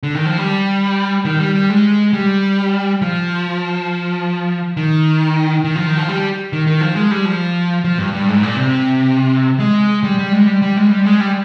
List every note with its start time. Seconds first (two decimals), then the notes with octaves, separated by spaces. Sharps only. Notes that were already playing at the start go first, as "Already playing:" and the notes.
0.03 D3
0.15 D#3
0.26 F3
0.38 G3
1.25 D#3
1.40 G3
1.55 G3
1.70 G#3
2.13 G3
3.02 F3
4.77 D#3
5.64 D#3
5.76 F3
5.87 D#3
5.97 F3
6.09 G3
6.53 D#3
6.67 D#3
6.81 F3
6.96 G#3
7.11 G3
7.25 F3
7.84 F3
7.98 G2
8.13 G2
8.28 G#2
8.43 A#2
8.57 C3
9.59 G#3
10.04 G3
10.19 G3
10.33 G#3
10.47 G3
10.62 G3
10.77 G#3
10.91 G3
11.05 G#3
11.20 G3